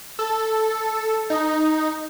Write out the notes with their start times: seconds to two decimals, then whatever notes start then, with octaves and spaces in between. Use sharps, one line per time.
0.19 A4
1.30 D#4